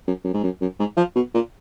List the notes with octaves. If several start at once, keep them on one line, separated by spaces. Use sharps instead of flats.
F#2
F#2
G#2
F#2
F#2
G#2
F3
B2
A#2